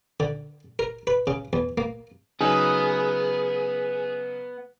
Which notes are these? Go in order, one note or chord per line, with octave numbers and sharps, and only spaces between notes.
D3
A#4
B4
C#3
E2
A#3
C#3 F#3 B3 D#4 G#4